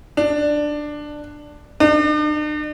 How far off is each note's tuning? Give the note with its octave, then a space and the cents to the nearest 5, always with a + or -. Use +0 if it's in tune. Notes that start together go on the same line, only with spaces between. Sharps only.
D4 +10
D4 +45